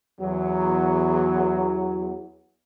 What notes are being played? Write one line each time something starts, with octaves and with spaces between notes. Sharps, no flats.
E2 F#3